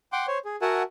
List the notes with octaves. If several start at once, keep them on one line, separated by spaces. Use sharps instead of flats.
F#5 G5 C6 D6
C5 C#5
G#4
F#4 A#4 E5 F#5 G#5 A5